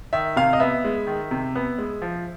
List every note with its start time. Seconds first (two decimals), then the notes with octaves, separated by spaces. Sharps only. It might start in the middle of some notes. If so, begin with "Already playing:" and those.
0.13 D#3 E5
0.36 C3 F5
0.53 D#5
0.60 B3 E5
0.84 G#3
1.07 D#3
1.31 C3
1.55 B3
1.78 G#3
2.02 F3